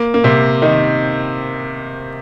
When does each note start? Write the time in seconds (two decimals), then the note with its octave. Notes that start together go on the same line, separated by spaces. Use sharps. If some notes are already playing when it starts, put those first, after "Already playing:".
Already playing: A#3
0.14 A#3
0.24 C3 C4
0.62 D#3 D#4